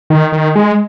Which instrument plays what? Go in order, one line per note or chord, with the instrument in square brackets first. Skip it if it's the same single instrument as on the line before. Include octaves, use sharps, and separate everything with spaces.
[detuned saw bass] D#3
D#3
G#3